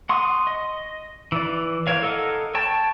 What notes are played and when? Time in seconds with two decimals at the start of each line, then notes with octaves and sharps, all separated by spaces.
0.09 F#5 C6 C#6 D#6
0.47 D#5
1.32 E3 D5
1.87 A#4 C5 C#5 F5
2.02 A4 A#4 D#5 F5 F#5
2.55 C#5 G5 A5